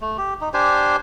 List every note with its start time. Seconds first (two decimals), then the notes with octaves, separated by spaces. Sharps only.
0.01 A3
0.18 G4
0.41 D#4
0.54 D4 G4 C5 G#5